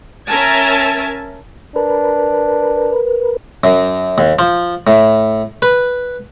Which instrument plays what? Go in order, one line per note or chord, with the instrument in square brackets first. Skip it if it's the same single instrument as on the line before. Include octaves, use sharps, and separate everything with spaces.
[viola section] C#4 A#4 E5 G#5 A5
[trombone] D4 [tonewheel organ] A#4 B4
[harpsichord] F#2
D#2
F3
A2
B4